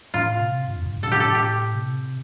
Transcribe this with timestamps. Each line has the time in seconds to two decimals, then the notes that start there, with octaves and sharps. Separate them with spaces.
0.14 A2 F4
0.41 C3
0.68 G2
0.76 F2
0.85 G2
0.95 A2
1.02 C3 A4
1.12 A2 G4
1.20 A4
1.35 A2 G4
1.75 C3